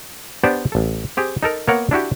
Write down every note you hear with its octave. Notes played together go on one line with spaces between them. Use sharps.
B3 D4 G4 C5 D5
A1 A4
C4 G4 G#4
D#4 A4 A#4
A#3 B3 A#4 C#5 F#5
D4 E4 F#4 G4